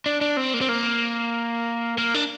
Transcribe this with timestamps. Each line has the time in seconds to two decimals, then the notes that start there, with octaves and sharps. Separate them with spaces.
0.06 D4
0.21 D4
0.37 C4
0.54 A#3
0.61 C4
0.69 A#3
1.98 A#3
2.14 D4